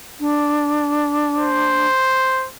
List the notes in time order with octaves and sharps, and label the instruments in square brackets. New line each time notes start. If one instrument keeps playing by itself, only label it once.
[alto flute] D4
[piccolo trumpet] C5